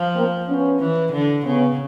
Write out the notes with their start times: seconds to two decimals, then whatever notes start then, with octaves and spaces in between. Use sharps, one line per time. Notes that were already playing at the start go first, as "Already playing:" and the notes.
Already playing: F3
0.14 A#3 C4
0.47 B3 C#4
0.79 E3
1.12 D3
1.45 C#3 B3 C#4